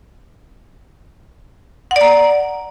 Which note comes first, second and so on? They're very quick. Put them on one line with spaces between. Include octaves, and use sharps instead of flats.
F#5 D5 A#5